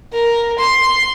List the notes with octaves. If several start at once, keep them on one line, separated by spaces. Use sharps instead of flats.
A#4
C6